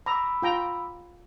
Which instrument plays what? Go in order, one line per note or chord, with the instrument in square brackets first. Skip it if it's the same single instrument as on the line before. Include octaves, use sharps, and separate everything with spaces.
[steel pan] A#5 [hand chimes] B5 D6 E6
[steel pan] F4 G5 A#5